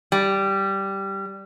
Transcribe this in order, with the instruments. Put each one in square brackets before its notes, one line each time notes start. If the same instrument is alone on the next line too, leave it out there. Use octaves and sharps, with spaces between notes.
[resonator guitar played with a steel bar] G3